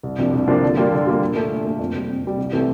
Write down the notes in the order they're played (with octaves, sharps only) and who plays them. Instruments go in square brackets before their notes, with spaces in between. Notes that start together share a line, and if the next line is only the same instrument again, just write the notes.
[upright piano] C2
C3 F3 A#3 D4
C2
C3 F3 A#3 D4
D3
G3 A#3 F4
D3
G3 A#3 F4
A#2
A3 D4 F4
A#2
A3 D4 F4
F2
C3 G3
F2
C3 G3
C2
C3 E3 A3